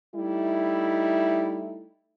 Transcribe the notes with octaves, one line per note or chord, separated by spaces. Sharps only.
G3 A3 D#4 E4